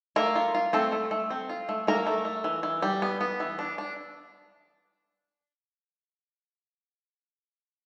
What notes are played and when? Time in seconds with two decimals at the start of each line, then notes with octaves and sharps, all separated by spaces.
0.16 A3 A#3 A#4
0.36 F4
0.55 F4
0.73 A3 C4 A4
0.92 A3
1.11 A3
1.30 C4
1.49 F4
1.69 A3
1.87 A3 A#3 A#4
2.07 A3
2.25 A3
2.44 E3
2.63 E3
2.82 G3
3.02 B3
3.21 B3
3.40 E3
3.59 D4
3.78 D4